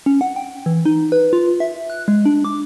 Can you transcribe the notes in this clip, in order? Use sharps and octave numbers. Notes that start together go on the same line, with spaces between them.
C#4
F#5
G5
E3
D#4
B4
F4
E5
F#6
G#3
D4
D6